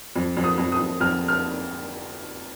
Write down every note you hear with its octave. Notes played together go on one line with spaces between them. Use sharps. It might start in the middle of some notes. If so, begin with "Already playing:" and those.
F2
F2
D#6
F2
D#6
F2
F2 F6
F6